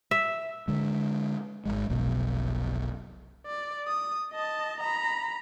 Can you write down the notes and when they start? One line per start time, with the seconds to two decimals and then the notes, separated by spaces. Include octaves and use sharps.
0.11 E5
0.68 D3 G#3
1.66 G#1 C#2 G#3
1.89 F1 B1 B2
3.46 D5
3.87 D#6
4.33 D#5 A5
4.81 A#5 B5